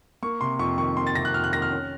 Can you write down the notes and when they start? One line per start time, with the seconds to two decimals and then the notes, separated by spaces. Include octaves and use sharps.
0.22 A#3 C#6
0.41 C3 C6
0.59 F2 C#6
0.78 D#3 C#6
0.96 A#3 C6
1.07 A6
1.15 C3 A#6
1.25 F#6
1.34 F2 F6
1.44 F#6
1.53 D#3 A#6
1.62 F6
1.71 C#4